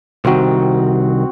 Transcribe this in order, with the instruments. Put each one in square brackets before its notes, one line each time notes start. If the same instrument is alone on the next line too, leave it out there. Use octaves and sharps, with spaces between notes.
[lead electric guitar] C2 D#3 [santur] C4 F#4